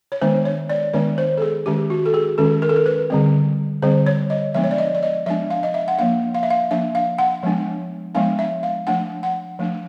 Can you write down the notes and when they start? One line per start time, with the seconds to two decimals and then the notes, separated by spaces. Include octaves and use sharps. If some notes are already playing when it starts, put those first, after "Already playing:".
0.12 C#5
0.22 D#3 G#3 B3 D4 C5
0.45 C#5
0.70 D5
0.94 D#3 G#3 B3 D4 C#5
1.18 C5
1.37 A4
1.42 G#4
1.66 D#3 G#3 C#4 G4
1.90 F#4
2.06 A4
2.14 G#4
2.38 D#3 G#3 C#4 A4
2.62 A#4
2.69 A4
2.76 A#4
2.86 B4
3.10 D3 G3 C4
3.82 D3 G3 C4 C5
4.06 C#5
4.30 D#5
4.54 F3 G#3 B3 D4 E5
4.64 C#5
4.71 D5
4.78 D#5
4.95 D5
5.03 D#5
5.26 F3 G#3 B3 D4 E5
5.50 F5
5.63 D#5
5.74 E5
5.88 F#5
5.98 F3 A#3 D4 F5
6.35 F5
6.43 E5
6.50 F5
6.71 F3 A#3 D4 E5
6.95 F5
7.18 F#5
7.43 F3 G#3 B3 D4
8.15 F3 G#3 B3 D4 F5
8.39 E5
8.63 F5
8.87 F3 A3 D4 F#5
9.23 F#5
9.59 F3 A3 D4